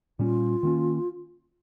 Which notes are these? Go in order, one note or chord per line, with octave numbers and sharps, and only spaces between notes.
A#2 G3 C#4 F4
D#3 A#3 C#4